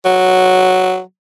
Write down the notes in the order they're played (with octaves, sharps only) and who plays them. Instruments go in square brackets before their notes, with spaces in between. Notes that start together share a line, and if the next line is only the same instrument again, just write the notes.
[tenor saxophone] F#3